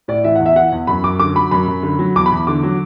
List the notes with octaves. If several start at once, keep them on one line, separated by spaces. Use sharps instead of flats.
A2 D5
E3 E5
E2 F#5
E5
E3 F#5
E2
F#2 B5
F#2 D6
D3 D6
F#3 B5
F#2 B5
F#2
D3
F#3
E2 D6
B5
E2
D3 D6
F#3